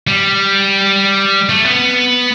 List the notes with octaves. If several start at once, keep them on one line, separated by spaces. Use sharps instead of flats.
G3
A3
B3